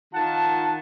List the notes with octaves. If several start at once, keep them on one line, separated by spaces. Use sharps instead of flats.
D#3 F4 F#5 A5